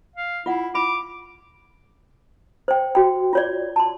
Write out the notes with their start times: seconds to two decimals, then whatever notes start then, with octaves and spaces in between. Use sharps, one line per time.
0.16 F5
0.46 E4 F4 F#5
0.75 F4 B5 D6
2.68 C5 G5
2.95 F#4 G5
3.33 F4 C#5 D5
3.76 A5 C6